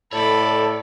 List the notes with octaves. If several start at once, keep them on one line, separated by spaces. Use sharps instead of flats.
A2 A4 C#5 D5 B5